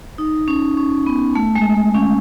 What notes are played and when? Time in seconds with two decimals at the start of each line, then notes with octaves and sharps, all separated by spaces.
0.18 D#4
0.48 C#4
0.77 C#4
1.06 B3
1.35 A3
1.55 G#3
1.74 A3
1.94 C#4